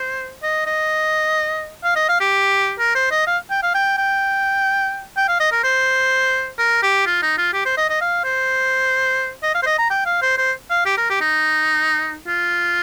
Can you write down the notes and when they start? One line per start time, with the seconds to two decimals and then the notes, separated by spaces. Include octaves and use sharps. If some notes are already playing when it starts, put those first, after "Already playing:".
Already playing: C5
0.43 D#5
0.67 D#5
1.84 F5
1.96 D#5
2.09 F5
2.20 G4
2.79 A#4
2.96 C5
3.11 D#5
3.27 F5
3.51 G5
3.63 F5
3.75 G5
3.98 G5
5.17 G5
5.28 F5
5.40 D#5
5.52 A#4
5.64 C5
6.59 A#4
6.83 G4
7.06 F4
7.23 D#4
7.38 F4
7.54 G4
7.66 C5
7.77 D#5
7.90 D#5
8.01 F5
8.24 C5
9.43 D#5
9.55 F5
9.63 C5
9.67 D#5
9.79 A#5
9.90 G5
10.06 F5
10.22 C5
10.38 C5
10.70 F5
10.86 G4
10.98 A#4
11.10 G4
11.21 D#4
12.28 F4